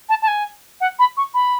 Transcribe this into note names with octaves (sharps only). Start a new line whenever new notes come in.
A5
A5
G#5
F#5
B5
C#6
B5